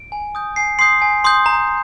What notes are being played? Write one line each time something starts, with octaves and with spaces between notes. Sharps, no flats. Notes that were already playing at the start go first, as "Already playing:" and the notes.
Already playing: D7
G#5
D#6 G6
G#5 C7
C6 D#6 G6 C7
G#5
C6 D#6 G6
A#5